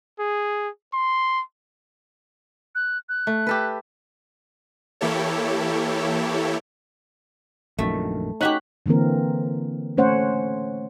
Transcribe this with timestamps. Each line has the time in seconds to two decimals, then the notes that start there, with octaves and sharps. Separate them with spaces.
0.19 G#4
0.93 C6
2.75 F#6
3.09 F#6
3.27 A3
3.47 G4 A4 B4
5.01 E3 A#3 E4 G4 A4 C#5
7.78 A#1 F#2 D#3 A3
8.41 C#4 D#4 F#4 G4 F#6 B6
8.86 D3 E3 A#3 C4 A#4
9.97 A3 C#4 C5 C#5 F#5